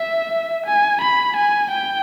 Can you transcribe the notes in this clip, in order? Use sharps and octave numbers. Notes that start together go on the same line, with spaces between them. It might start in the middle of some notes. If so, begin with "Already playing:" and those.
Already playing: E5
G#5
B5
G#5
G5